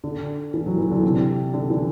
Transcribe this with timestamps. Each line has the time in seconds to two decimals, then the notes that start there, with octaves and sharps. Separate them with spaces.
0.04 D3
0.54 E3
0.66 F#3
0.78 E3
0.91 D3
1.03 C3
1.54 D3
1.70 E3